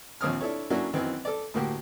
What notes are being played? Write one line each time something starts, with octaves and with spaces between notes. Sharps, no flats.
A#1 D#2 C4 C#5 D#6 F6
D4 E4 A4 C#5
F#3 A#3 C#4 D4 E4 F#4
F#2 D#3 E3 C4
A4 D5
D2 A2 A#3 F#4 G4